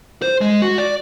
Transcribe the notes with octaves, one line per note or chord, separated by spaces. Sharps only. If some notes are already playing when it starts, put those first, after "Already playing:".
C5
G#3
F#4
D5